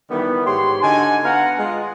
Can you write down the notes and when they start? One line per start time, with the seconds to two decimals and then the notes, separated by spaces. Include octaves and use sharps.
0.10 D#3 E3 G3 B3
0.45 G#2 G4 C#5 C6
0.82 D3 D#4 F#4 G#5
1.23 B3 F5 F#5 A#5
1.58 G#3 F4